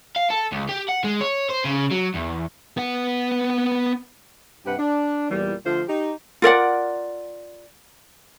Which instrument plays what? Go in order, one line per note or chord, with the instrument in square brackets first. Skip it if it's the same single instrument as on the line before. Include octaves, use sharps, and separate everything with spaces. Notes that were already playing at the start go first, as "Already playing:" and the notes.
[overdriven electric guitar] F5
A4
C#2
G4
F#5
G#3
C#5
C5
C#3
F#3
E2
[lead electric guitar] B3 F#5
[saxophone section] G2 C3 G4 B4 F#5
D4
E2 A#2 E3 G3
D3 F3 A3 F4 C5
D#4 G4
[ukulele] F4 A#4 D5 F#5